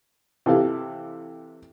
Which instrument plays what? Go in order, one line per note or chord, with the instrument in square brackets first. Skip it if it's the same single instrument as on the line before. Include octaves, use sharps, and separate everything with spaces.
[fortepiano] C3 E3 A4 F5